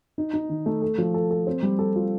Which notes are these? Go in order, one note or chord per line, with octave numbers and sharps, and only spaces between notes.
D#4
D#4
D#3
A3
A4
F3
A4
A4
C4
G3
A4
F4